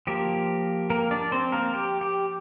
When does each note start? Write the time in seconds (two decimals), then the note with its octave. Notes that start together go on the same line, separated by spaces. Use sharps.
0.07 F3 A#3 G4
0.90 A#3 A#4
1.11 D4 D5
1.32 C4 C5
1.52 A#3 A#4
1.74 G4
2.01 G4